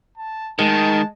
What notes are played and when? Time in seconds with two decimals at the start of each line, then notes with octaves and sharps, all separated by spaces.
0.18 A5
0.59 D#3 G#3 A5